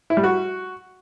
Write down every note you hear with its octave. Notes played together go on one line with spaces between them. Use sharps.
E4
G3
F#4